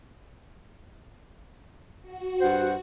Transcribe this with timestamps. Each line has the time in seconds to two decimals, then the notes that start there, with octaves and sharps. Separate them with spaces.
2.02 F#4
2.41 G2 C5 F#5